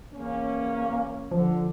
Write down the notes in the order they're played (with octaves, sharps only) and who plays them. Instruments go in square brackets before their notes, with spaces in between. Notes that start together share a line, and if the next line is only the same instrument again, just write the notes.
[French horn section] E2 C#4 [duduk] A#3
[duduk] D3 [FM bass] F3